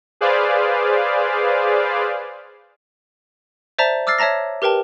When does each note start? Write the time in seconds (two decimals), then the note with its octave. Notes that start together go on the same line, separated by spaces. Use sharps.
0.21 G#4 B4 C5 D5 F5
3.79 C5 D5 E5 A5 A#5
4.07 D6 E6 F6 A6 C7
4.18 C#5 E5 A5 A#5 A#6
4.62 G4 A#4 B4 G5 A5